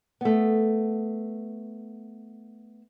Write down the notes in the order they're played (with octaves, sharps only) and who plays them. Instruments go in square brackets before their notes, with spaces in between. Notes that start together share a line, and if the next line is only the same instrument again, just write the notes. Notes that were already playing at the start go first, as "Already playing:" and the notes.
[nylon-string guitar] A3 B3